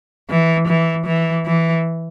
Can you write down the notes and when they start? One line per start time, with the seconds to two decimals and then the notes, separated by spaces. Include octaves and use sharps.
0.30 E3
0.68 E3
1.06 E3
1.45 E3